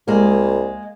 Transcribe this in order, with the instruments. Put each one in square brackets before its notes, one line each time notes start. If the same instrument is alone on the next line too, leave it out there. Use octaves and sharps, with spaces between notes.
[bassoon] C2 [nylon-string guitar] G#3 A#3